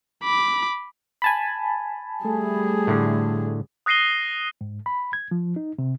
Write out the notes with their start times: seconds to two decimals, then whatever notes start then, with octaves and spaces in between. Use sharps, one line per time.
0.23 B5 D6
1.22 G#5 A5 B5
2.24 G3 A3 G#4
2.87 A2 D3
3.86 D#6 F#6 A#6 C7 D#7 G7
4.61 G#2
4.86 B5
5.13 G#6
5.31 F3
5.56 D#4
5.79 C3